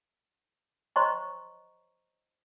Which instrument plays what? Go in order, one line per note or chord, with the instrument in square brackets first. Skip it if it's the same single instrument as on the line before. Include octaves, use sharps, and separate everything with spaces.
[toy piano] C5 C#5 D#5 A#5 C6 C#6